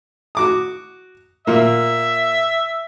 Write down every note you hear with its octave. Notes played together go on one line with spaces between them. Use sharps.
F#4 D6 D#6
A#2 A#3 E5